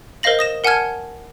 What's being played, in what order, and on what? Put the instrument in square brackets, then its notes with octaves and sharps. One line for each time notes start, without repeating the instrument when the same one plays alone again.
[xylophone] A#4 C5 D#5 F5 A#6 F#7
D#6 A#6 E7
A#4 F#5 G#5 A5 F6 G#6